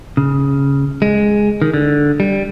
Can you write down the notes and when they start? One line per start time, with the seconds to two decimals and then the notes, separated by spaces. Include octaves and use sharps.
0.17 C#3
1.02 G#3
1.62 D#3
1.74 D3
2.20 G3